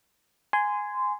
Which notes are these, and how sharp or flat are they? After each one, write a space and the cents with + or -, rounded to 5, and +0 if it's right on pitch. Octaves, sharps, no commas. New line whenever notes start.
G#5 +0 C6 -20